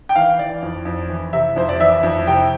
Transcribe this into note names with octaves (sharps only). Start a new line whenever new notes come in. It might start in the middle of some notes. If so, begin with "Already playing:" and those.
G5
E3 F5
E3 D5
F2
F2
E3
C3 E5
F2 C5
D5
E3 E5
F2
C3 G5